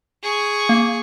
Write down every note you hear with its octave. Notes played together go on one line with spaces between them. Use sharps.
G#4 C#6
A#3